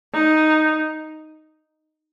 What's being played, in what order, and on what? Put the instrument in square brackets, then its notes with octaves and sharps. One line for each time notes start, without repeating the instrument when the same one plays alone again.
[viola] D#4